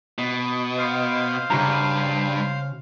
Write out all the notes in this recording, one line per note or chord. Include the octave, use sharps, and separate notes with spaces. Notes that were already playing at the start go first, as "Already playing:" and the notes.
B2
C5 F5
G2 C#3 F#4 A#5